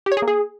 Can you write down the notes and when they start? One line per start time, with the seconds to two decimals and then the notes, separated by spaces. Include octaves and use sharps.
0.06 G4
0.12 C#5
0.17 G#4
0.22 A#3
0.28 G#4